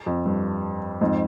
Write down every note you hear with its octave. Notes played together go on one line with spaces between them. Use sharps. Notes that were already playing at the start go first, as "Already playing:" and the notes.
F2
G2
F2 G#2